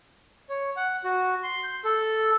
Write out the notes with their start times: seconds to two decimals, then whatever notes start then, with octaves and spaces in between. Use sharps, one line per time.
0.49 C#5
0.77 F#5
1.04 F#4
1.43 C6
1.64 G6
1.85 A4